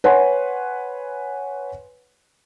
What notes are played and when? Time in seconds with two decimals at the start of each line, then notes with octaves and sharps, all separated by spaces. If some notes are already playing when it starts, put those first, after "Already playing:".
0.04 B4 C#5 F#5 G#5 C6